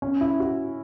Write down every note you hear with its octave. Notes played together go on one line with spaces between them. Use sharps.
C#4
E4
F#4